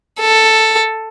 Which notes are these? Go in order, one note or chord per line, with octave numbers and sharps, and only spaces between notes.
A4